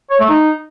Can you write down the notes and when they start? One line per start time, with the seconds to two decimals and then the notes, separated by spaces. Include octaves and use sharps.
0.10 C#5
0.20 A3
0.29 D#4